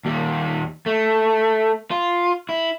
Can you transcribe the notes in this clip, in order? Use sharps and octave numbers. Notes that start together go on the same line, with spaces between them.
D#2 G3
A3
F4
E4